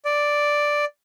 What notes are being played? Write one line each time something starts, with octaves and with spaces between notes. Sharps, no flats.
D5